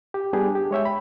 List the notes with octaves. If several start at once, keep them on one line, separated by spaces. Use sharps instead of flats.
G4
G3 B3 D4 G4 G#4
G4
G#3 C#5 E5 G5
B5